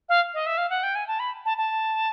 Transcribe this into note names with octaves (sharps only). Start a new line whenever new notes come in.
F5
D#5
E5
F5
F#5
G5
G#5
A5
B5
A5
A5